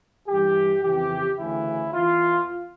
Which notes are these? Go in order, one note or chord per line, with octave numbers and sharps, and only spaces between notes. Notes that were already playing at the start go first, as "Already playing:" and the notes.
G2 E3 G4
F2 C#3 E3 G4
D2 C#3 E3 E4
E2 E3 F4